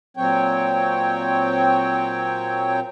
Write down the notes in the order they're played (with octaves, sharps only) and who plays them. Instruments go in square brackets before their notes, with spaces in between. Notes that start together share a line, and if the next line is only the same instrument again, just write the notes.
[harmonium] A#2 F#3 C4 C#5 G5